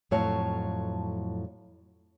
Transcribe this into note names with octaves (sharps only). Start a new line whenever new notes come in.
F2 A2 F#3 C#5 F5 A5